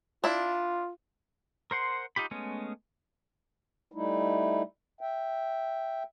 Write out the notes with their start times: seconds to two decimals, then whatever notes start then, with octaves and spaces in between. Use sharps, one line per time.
0.24 D4 E4 F4
1.71 A#4 C5 F#5 C6
2.16 D#4 F4 G4 B5
2.31 G#3 A3 B3 C#4
3.92 G3 A3 D#4 E4
5.01 E5 G5